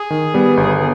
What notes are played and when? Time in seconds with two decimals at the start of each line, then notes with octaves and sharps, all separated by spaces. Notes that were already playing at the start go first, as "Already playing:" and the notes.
Already playing: G#4
0.10 D#3
0.34 G3 B3
0.57 G1